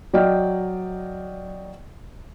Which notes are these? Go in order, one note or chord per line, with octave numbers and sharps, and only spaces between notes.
F#3 D5 D#5 G5 F6